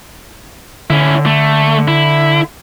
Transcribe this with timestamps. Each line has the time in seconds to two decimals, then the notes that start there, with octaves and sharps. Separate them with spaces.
0.90 D3 C#4 E4
1.26 A3
1.88 E4